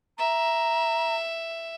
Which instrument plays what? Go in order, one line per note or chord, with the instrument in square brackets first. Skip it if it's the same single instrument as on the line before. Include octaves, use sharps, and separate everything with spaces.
[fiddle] E5 [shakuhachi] A#5